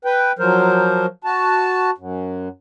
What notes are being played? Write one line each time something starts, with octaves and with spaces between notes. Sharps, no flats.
B4 G5
F3 F#3 A#4 C5
F#4 A5
F#2